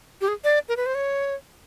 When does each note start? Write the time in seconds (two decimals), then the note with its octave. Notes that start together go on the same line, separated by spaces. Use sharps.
0.21 G4
0.28 G#4
0.44 D5
0.68 A#4
0.77 B4
0.86 C5
0.95 C#5